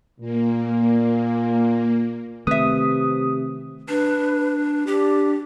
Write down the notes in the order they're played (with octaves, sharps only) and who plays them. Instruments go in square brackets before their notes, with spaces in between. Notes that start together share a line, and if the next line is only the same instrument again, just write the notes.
[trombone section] A#2 [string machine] A#3
[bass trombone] C3 [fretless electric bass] D#3 A3 C4 [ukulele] B4 E5 [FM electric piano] D#6
[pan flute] D4 [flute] B4
[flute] D4 [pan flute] G4